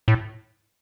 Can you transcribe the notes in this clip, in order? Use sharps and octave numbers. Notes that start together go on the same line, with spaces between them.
A2